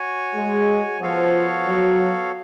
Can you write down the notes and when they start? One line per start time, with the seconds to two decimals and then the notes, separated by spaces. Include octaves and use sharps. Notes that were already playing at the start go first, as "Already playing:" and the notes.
Already playing: F#4 C#5 G#5
0.35 G#3
1.00 F3 B3 F#4 A4 C#5 F5
1.66 F#3